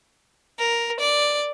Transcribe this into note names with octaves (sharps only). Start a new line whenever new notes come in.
A#4
D5